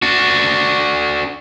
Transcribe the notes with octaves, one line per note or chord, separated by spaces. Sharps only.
D4 F#4